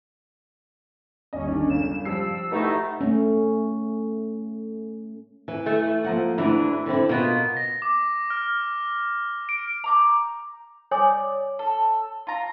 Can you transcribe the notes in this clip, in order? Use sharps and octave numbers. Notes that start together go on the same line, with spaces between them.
G1 D#2 C#4 D#5
D3 D4
G1 F#2 C#3 E7
F3 G3 E6 C7
B2 A3 D#4 E4 G4 A4
A3 C#4
E3
A3
F3 A#3 F#5
D2 E3 D4 E4
D3 C4 E4
B2 A#3 B3 F4
A#6
D6
F6
D7
A#5 D6 G6
C#5 D5 G#5 D#6
A4
F4 A#5